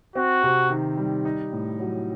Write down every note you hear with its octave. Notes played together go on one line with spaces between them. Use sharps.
C4 F#4
C3
D#3
G3
D#4
A2
F#3